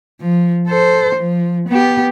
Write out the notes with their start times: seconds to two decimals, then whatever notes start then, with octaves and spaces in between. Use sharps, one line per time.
0.20 F3
0.68 A4 C5
1.15 F3
1.69 B3 G4